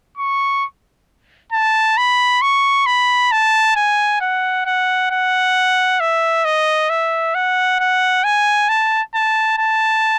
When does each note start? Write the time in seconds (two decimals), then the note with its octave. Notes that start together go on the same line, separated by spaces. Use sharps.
0.18 C#6
1.52 A5
1.97 B5
2.42 C#6
2.86 B5
3.32 A5
3.76 G#5
4.21 F#5
4.66 F#5
5.11 F#5
6.01 E5
6.45 D#5
6.90 E5
7.35 F#5
7.80 F#5
8.24 G#5
8.69 A5
9.15 A5
9.59 A5